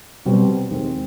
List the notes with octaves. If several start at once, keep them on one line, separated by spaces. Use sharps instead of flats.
B2 G3 C4
D#2 D#3 G#3 C4